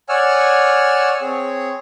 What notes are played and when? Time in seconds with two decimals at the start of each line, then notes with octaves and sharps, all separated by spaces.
0.09 C#5 D5 F#5 G#5 E6 F6
1.21 C4 G#4 C#5